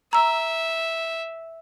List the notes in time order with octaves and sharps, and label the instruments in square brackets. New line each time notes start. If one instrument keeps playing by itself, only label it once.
[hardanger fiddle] E5 [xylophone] A#5 E6